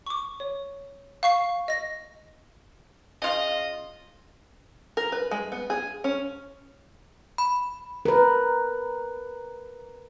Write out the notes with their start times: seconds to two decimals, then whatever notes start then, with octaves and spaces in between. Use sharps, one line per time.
0.06 C#6 D6
0.40 C#5
1.23 F5 C#6 C7
1.68 D#5 A#6
3.22 C#3 F4 D#5
4.97 A#4
5.12 B4
5.31 G#3
5.52 B3
5.70 G#4
6.04 C#4
7.38 B5
8.05 A#4 B4